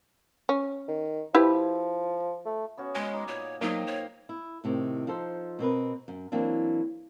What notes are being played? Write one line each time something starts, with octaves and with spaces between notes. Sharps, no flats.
C#4
D#3
F3 E4 G4 B4
A3
B3 C#4 F#4
G#3 C#5 G#5
D#4 D#5 D6
A#2 C#5
F#3 A#3 D#4 C5 F5 G5
C#5
E4
A2 C3 D#3
F3 D#4 A4 C5
B2 C4 A#4 B4
F#2
E3 F#3 A#3 C4 D4